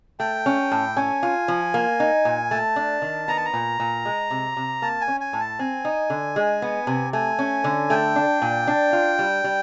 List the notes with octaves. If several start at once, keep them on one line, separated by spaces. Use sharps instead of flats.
A3 G5
C#4
A2
C#4 G#5
F4
F3
A#3
D#4
A#2
A3 A5
D4
D#3
B3 A#5
A5
A#5
A#2
A#2
G#3
C3
C3
A#3 A5
G#5
C#4
G#5
A2
A5
C4 G#5
D#4
D3
G#3
B3
C3
A3 G#5
C#4
D3
A3 G5
D4
A#2
D4
F4
G3
G3